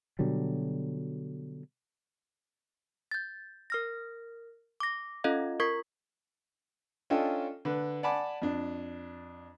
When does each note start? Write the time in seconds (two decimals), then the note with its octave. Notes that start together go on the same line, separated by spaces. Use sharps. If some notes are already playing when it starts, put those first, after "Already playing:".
0.19 B2 D3 F#3 G3
3.11 G6 A6
3.70 A#4 F6 A#6
4.80 D6 A#6
5.24 C#4 F4 A4 D#5 F5
5.60 F4 A#4 C#6 G#6 B6
7.10 C#4 D4 F4 A4 D#5 G5
7.65 D3 B4
8.03 D5 F#5 G#5 A5 B5 D6
8.42 F2 D4